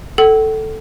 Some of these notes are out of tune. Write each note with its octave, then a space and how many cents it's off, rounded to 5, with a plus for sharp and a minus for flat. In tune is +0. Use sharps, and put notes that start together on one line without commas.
A4 +0 F#5 +45